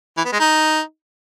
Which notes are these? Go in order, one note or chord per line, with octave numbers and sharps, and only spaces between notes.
E3
B3
G#3
D#4